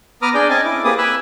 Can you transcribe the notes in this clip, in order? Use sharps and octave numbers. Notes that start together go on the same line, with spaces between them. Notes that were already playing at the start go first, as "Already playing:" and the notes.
B3 B4 A#5 D6 D#6 F6
D4 G#4 D5 G6
C4 C#4 D#5 G#5 A5
E4 D6
A#3 C4 G4 G#4 B4 D#6
G#5 B5 E6 F#6